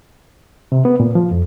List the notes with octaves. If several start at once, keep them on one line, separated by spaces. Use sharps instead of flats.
C3
B3
A#2
F3
F2